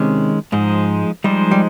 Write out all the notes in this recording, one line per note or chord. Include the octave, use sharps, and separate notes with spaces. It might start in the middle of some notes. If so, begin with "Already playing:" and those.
Already playing: C3 D#3 G#3 C#4
G#2 F3 G#3 D#4 G#4 C5
F3 G3 G#3 D#4 G#4 C5
G3